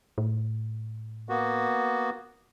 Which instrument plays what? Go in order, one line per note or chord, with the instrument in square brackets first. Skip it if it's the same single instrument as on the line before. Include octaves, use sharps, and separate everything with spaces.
[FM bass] A2
[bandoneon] A#3 B3 F#4